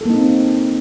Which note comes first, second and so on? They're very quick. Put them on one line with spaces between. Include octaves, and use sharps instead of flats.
A4 A#3 D#4 C4